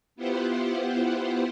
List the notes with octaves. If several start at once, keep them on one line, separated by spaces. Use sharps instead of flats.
B3 E4 F4 G4 C5 F#5